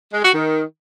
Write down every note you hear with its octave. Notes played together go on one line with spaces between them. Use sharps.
G#3
F#4
D#3